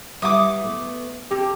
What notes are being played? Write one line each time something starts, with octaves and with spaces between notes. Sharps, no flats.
G3 E4 B4 E5 F#5 D6 D#6
A3 B3
C4 G4 A4